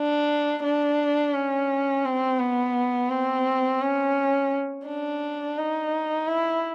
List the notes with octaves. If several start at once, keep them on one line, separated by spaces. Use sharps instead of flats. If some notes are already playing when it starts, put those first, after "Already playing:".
Already playing: D4
D4
C#4
C4
B3
C4
C#4
D4
D#4
E4